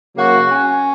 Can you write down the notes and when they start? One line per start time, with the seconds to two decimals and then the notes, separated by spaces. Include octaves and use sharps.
0.15 C#3 F#3 A#3 F#4
0.49 C#4